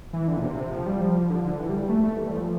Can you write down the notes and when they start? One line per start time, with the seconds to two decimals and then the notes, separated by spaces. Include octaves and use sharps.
0.13 E3
0.28 D3
0.37 A#2
0.43 C3
0.57 C3
0.72 F3
0.86 G3
1.01 F3
1.30 D3
1.45 D3
1.59 E3
1.69 G3
1.89 A3
2.03 A3
2.17 E3
2.28 G3
2.32 F3